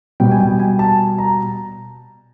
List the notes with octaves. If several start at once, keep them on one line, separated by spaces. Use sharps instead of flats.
B2 G3 B3 G5
G#5
G5
G#5
A5
A#5